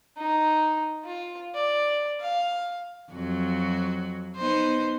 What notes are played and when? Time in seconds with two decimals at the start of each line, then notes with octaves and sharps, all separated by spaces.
0.17 D#4
1.05 F4
1.55 D5
2.21 F5
3.12 F2 F#3 F#4
4.36 B3 D#4 C5